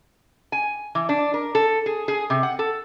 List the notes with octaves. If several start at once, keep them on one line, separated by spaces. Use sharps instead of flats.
G#5
E3
D4
A#4
A4
G#4
G#4
C3
F#5
A4